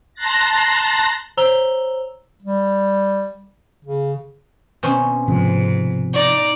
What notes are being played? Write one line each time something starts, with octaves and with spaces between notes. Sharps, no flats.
A5 A#5 C6 F#6 A6 A#6
C5 C#5 A#5 E6 F7 G7
G3
C#3
B2 C4 C#4
G#2 C3 F3
D#4 D5